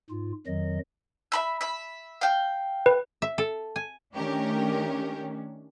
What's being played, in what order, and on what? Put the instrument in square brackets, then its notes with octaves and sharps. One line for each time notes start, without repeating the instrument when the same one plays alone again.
[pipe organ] G#2 F4
F2 D#3 F#3 D#5
[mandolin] E5 B5 E6
E5 B5
F5 G5
[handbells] B4
[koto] E5
A4
G#5
[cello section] D#3 C#4 D4 [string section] A3 G4 A#4